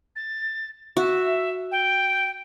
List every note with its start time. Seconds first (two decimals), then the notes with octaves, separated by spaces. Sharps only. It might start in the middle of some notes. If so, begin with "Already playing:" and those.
0.16 A6
0.97 F#4 E5
1.72 G5